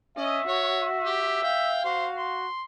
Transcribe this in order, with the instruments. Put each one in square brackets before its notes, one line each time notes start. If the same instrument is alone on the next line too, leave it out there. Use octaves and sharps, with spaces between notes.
[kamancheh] C#4 [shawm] D#5 [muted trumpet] E5
[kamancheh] F#4 [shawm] C#5
[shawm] G4
[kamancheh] F5 [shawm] G5
[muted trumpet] F#4 [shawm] C5
[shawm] C6